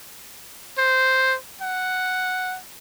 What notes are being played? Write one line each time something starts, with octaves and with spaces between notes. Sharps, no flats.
C5
F#5